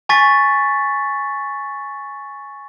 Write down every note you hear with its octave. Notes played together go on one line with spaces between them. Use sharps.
G#5 C#6 A6 B6